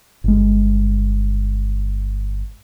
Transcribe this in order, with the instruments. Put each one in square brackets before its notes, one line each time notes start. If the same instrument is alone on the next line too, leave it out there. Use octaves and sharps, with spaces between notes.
[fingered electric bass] G1 G#3